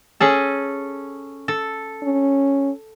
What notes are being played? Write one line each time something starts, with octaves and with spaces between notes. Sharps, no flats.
C#4 G#4 A4
A4
C#4